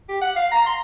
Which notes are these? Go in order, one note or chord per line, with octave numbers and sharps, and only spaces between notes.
G4
F#5
F5
A#5
C6